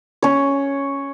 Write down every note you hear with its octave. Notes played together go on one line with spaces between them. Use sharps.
C#4 C#5